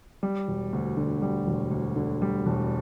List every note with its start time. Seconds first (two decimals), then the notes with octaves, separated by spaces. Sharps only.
0.23 G3
0.48 E1
0.73 D2
0.97 D3
1.22 G3
1.47 E1
1.71 D2
1.96 D3
2.22 G3
2.46 E1